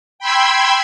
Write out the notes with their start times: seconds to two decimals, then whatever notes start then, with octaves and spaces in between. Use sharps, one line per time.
0.19 G5 B5 C6 E6 G#6